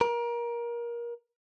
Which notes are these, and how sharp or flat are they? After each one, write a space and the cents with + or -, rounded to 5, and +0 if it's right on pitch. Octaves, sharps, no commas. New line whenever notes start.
A#4 +25